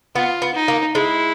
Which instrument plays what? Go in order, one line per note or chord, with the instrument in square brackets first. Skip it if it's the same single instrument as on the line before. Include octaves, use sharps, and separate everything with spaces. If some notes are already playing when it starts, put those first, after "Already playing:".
[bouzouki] B3 [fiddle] F4
[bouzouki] B3
[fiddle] D#4
[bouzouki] A#3
[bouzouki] G#3 [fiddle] E4